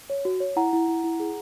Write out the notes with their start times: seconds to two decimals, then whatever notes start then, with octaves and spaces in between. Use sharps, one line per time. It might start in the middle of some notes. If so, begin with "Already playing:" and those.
0.10 C#5
0.25 F#4
0.40 C#5
0.56 E4 F#5 A#5
0.73 E4
0.88 E4
1.04 E4
1.20 G#4